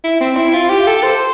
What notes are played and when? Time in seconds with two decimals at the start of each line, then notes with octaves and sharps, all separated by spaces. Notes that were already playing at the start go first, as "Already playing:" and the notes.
0.04 E4
0.20 C4
0.36 E4
0.53 F4
0.70 G4
0.87 A4
1.03 C5